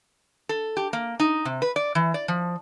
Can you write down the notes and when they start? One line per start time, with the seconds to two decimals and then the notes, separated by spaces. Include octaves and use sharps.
0.49 A4
0.77 G4
0.93 A#3
1.20 D#4
1.45 C3
1.62 B4
1.76 D5
1.95 E3
2.14 D5
2.28 F3